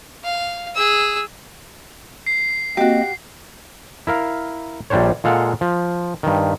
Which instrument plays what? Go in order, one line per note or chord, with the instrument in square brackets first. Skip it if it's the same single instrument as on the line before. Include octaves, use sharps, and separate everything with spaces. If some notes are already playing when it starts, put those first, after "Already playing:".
[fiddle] F5
G#4 E6
[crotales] C7
[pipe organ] A#3 C4 D#5 [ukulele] F#4 G4
[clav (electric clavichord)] E4 A#4 F5
A#1 G3 D4 C5 C#5
A#2 G#3 A4 F5 F#5
F3
G2 D#3